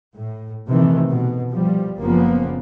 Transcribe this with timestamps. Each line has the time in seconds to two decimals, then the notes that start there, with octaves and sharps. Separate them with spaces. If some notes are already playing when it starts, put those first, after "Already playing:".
0.15 A2
0.67 C3 D#3 E3 A3
1.12 B2
1.51 F3 G3
1.99 F#1 C#3 F3 A#3 B3